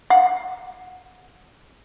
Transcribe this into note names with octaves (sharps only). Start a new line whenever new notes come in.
F5 F#5